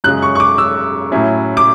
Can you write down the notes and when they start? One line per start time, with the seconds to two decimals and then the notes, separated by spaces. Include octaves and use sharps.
0.04 F#2 C#3 G#3 F#6
0.22 C#6
0.35 C#6
0.40 D6
0.58 E6
1.12 A2 F#3 C#4 E4
1.57 D6